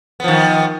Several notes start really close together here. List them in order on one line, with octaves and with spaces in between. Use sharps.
B3 F3 D#3